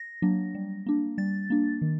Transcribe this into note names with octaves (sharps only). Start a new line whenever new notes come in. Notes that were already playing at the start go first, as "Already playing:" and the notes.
Already playing: A#6
F#3 A#3 D4
G3
A#3 D4
G3 A6
A#3 D4
D#3